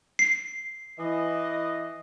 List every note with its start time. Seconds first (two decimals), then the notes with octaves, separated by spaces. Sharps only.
0.19 C7
0.98 E3 D#5